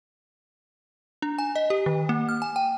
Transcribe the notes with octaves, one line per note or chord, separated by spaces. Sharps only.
D4
G#5
D#5
G4
D#3
A#3
F6
G#5
G5